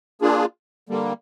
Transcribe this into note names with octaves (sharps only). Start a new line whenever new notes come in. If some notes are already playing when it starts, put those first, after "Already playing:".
A#3 D4 F4 G#4
D3 G3 A#3